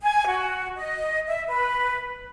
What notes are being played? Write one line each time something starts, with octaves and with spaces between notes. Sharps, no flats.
G#5
F#4
D#5
E5
B4